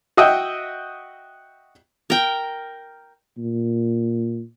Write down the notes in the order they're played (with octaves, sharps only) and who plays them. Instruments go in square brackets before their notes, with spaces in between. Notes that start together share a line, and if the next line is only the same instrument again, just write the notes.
[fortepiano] F#4 D#5 E5 G5
[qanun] A#4 G5
[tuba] A#2